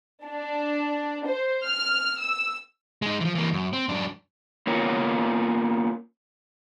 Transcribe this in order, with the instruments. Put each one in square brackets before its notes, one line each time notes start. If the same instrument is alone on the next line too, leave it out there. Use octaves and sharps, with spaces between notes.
[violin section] D4
C5
F6
E6
[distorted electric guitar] G#3 D#4
E3 F3
E3 A#3
F#2
C4
F#2 D4
[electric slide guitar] A#3 B3 C#4 F4 A#4 C#5